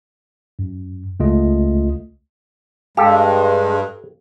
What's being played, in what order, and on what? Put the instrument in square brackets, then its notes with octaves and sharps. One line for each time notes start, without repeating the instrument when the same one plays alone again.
[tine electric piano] F#2
C#2 A3 F4 D#5
[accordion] G2 [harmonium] G#3 [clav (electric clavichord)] G4 A4 [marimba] F5